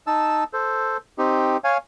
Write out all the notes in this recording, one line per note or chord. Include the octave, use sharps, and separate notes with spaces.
D#4 A5 E6
A4 C5
C4 D#4 G4
C#5 F5 G#5